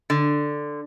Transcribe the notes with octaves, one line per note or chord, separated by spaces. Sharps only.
D3